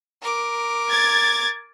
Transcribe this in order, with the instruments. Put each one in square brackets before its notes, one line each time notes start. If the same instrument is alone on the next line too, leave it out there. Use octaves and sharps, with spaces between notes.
[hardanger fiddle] A#4 D6
[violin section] G#6 A6